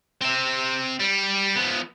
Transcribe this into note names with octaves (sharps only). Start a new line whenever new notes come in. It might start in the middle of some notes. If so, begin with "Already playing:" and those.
C4 E5
G3
F3 B3